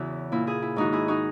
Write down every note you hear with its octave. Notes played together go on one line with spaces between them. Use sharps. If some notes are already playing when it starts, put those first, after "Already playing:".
Already playing: E2 C#3 E3 E4 F#4
A#2 E4
E4 G#4
E4
G#2 D#3 D#4 F#4
E4 G#4
D#4 F#4